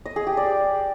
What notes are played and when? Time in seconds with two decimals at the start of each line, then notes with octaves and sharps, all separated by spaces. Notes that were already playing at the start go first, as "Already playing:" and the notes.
0.06 D#5
0.16 G#4
0.27 G4
0.37 D5